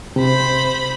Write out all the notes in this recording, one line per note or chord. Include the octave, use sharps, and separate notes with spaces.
C3 C5 B5